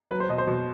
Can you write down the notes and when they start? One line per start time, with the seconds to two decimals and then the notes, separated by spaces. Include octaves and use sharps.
0.11 F#3 B4
0.20 C5
0.29 B2 D#5
0.38 C5
0.47 B2